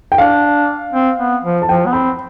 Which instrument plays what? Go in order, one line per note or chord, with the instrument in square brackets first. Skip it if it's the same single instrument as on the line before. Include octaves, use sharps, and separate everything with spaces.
[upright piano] G5
[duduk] D4 [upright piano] F5
[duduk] C4
B3
F3
[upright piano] A5
[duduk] F3 [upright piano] G5
[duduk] B3
[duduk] C4 [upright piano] B5